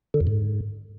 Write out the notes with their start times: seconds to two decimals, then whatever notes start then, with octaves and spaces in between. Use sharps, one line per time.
0.14 D3
0.21 F2
0.27 G#2